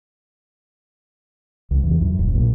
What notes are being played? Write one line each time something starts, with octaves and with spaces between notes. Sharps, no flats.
C#2
E2
F#2
D#1
A#1